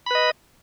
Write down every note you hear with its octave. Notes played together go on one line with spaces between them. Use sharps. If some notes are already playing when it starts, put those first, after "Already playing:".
B4 D#5 B5